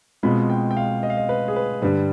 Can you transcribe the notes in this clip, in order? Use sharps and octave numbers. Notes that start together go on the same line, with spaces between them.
B2 G#3 C4 F4 B5
G5
G5
F5
D#5
F5
D#5
B4
G#4
B4
G2 D3 G3 B4